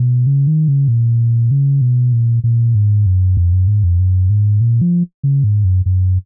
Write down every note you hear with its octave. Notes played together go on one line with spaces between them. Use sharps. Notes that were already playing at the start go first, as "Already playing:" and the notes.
Already playing: B2
C#3
D#3
C#3
A#2
C#3
B2
A#2
A#2
G#2
F#2
F2
F#2
G#2
F2
F#2
G#2
A#2
F3
C#3
G#2
F#2
F#2